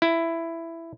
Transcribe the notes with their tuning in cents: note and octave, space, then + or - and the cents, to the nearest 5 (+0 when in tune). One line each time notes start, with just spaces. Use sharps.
E4 +10